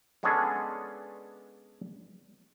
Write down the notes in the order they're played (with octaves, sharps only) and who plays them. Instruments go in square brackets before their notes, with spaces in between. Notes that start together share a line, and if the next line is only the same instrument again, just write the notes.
[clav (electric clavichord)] G#3 B3 C#4 D4 G#4 A4